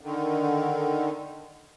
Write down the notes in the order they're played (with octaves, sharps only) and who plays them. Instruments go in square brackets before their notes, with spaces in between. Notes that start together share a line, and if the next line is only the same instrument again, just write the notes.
[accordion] D3 D#3